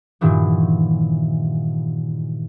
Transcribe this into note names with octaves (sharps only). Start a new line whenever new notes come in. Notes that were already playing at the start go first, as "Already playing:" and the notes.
G2 A#2 D#3 E3 F#3